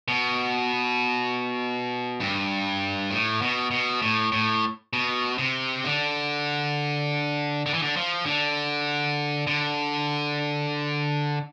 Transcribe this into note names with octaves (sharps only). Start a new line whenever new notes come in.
B2
G2
A2
B2
B2
A2
A2
B2
C3
D3
D3
E3
D3
F3
D3
D3